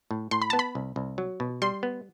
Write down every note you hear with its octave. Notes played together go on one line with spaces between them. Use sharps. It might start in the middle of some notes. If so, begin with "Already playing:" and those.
A2
A2 C6
B5
B3 A5
B5
C2
C2
F#3
B2
G3 C6
B3